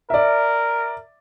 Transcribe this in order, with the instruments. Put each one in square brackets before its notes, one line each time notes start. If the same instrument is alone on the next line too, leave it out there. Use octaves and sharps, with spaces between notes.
[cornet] A#4 [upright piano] D5 E5